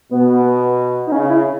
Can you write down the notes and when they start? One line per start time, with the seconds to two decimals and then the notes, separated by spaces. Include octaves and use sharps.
0.11 B2 B3
1.07 D#4
1.12 C#3 C#4
1.29 E4